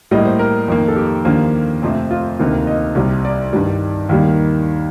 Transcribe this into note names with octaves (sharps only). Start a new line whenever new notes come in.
A2 G3 A#3 D#5
C5
A#4
F2 D#3 A#3
A4
G4
D#2 D3 F3 A#3
F2 C3 F3 A3 C4
F4
D2 C3 D#3 A#3
D#5
C2 C3 G3
D5
G2 D#3 G3
D#2 D#3 G3 A#3